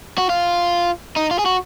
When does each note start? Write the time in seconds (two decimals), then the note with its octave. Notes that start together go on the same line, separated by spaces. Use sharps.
0.18 F#4
0.29 F4
1.16 D#4
1.31 F4
1.39 G#4
1.46 F#4